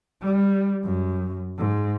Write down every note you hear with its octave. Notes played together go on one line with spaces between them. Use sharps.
G3
F#2
G#2